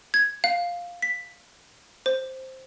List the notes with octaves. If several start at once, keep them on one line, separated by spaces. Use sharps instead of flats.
G#6
F5
B6
C5